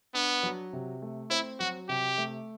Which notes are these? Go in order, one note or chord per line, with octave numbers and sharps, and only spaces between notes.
B3 D4
F#3
C3
A3
C4 E4
F#3 F#4
C3 G4
A3